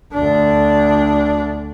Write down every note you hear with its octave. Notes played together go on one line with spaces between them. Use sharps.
D2 D4